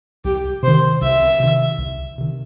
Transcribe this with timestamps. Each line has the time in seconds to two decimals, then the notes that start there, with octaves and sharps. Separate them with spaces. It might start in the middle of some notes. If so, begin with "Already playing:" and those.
0.25 C2 G4
0.63 C3 D#3 C5
1.02 C2 E5
1.40 C3 D#3
1.79 C2
2.18 C3 D#3